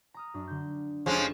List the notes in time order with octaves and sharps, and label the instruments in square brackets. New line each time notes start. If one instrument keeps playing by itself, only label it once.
[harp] A#5 D#6 F6
F#2 D4
D3 G6
[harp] F1 G4 [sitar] F3 G#3 C#4